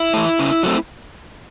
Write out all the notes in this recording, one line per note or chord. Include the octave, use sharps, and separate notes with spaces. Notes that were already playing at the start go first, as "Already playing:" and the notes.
Already playing: E4
E3 A3
C#3
F#3 A3 C4